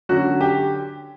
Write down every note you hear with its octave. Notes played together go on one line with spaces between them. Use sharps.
D3 F#3 C#4 F#4
G4